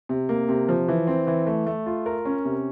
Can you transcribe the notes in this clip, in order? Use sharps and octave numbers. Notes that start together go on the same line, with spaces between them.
C3
A#3
C3
F3
E3
C4
E3
A3
A3
F4
A#4
C#4
C3